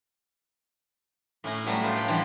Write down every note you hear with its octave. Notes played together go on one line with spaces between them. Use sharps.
A2 C#4 E4 A#5
F#3 G3 A3 B3
A2 F4 C5
B4 C#5 F5 G5 B5
D3 E3 F3 G3